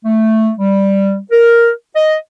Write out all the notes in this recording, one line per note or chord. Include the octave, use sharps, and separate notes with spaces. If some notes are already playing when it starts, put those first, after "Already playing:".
A3
G3
A#4
D#5